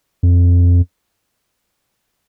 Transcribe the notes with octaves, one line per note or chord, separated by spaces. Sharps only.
F2